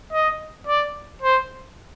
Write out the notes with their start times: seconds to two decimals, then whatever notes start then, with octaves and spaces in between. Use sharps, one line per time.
0.12 D#5
0.67 D5
1.22 C5